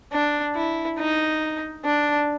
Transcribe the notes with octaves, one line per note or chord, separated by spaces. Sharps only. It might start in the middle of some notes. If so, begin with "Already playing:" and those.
D4
E4
D#4
D4